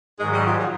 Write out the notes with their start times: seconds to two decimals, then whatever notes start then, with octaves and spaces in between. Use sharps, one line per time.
0.19 G#2 D#3 F#3 G#3
0.33 G3
0.46 F3
0.59 F#3